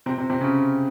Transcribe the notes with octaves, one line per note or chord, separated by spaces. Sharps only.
C3 C4
C3 C4
C3 C4
C#3 C#4